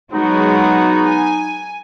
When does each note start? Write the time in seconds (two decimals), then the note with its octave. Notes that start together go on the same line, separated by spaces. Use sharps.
0.13 F#3 G#3 B3 D#4 F#4
1.08 G#5